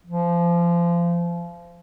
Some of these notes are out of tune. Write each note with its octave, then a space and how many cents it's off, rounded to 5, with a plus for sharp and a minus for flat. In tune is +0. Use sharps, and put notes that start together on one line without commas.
F3 -25